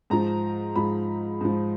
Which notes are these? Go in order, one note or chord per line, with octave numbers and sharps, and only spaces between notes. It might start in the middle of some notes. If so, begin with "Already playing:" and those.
G#2 F3 A#5
G#2 F3 B5
G#2 F3